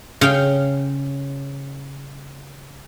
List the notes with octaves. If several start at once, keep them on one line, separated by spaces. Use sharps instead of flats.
C#3 F5 G5